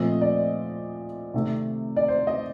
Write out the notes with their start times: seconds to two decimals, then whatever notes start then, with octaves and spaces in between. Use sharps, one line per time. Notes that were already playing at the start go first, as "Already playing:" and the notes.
Already playing: A#2 F3 A3 C4 D#5
0.21 D5
1.34 C3 D#3 A3 C4
1.96 D5
2.08 C5
2.27 D#5